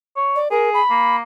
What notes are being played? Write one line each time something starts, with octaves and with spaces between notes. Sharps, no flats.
C#5
D5
G#4 A#4
B5
A#3